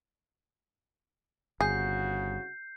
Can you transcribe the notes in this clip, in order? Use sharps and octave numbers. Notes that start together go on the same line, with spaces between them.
G1 C2 C#3 F#4 G#4 G6 C7